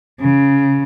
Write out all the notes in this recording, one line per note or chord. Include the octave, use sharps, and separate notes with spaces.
C#3